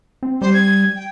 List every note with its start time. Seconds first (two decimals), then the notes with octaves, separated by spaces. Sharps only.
0.23 C4
0.42 G3 C5
0.54 G#6
0.96 G5